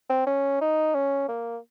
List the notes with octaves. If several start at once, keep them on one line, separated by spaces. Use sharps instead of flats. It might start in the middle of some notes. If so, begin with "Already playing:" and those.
C4
C#4
D#4
C#4
A#3